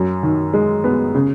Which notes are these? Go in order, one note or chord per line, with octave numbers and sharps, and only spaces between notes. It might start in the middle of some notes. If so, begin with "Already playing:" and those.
Already playing: F#2
D#3
G#3
B3
C#3